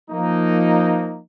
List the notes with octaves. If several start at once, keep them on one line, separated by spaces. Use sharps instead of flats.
F3 A#3 D#4